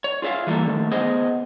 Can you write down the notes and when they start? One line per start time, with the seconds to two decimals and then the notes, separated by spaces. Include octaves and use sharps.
0.04 C#5
0.22 F4 G#4 B4 E5 F5
0.47 E3 G3 G#3 A#3 A4
0.67 D3 D#3 F3 A3
0.91 B3 G#4 C5 D#5